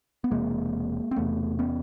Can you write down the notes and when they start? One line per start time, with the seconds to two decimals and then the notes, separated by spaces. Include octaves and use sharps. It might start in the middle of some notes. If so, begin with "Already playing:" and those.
0.24 B3
0.31 E1 E2 C3 G#3 A#3
1.11 C4
1.16 E1 E2 C3 A3 B3
1.59 B3 C#4